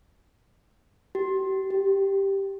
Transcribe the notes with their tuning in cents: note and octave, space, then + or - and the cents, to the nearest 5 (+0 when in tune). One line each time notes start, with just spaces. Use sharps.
G4 -35
G4 +0